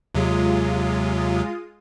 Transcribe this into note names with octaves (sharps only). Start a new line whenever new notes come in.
D#2 C3 F#3 G#3 F4 D#6